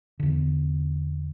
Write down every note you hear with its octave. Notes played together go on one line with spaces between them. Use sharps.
E2 D3